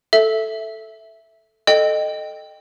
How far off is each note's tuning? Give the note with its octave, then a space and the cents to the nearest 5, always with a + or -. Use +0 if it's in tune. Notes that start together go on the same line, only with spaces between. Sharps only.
A4 +0 E5 +0
A4 +0 D#5 -15 G5 +0